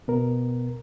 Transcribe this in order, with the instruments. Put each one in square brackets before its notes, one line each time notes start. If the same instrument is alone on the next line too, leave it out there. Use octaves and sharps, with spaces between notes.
[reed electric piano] B2 B3 A#4